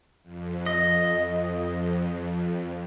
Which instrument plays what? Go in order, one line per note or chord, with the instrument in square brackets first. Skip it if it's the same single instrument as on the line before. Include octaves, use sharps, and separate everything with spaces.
[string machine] F2
[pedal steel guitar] D#5